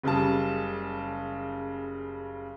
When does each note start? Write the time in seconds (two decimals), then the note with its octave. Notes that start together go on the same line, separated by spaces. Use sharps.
0.04 F#1 C#3 G3 A5